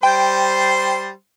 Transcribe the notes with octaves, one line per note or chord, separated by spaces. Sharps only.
G3 C5 G5 C6